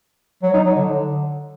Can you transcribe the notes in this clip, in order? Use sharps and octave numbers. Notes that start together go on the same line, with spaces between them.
F#3
D#4
F#3
D3